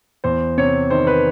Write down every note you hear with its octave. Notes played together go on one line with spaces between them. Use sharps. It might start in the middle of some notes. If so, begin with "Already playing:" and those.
E2 C5
C3 C#5
D#3 C5
B4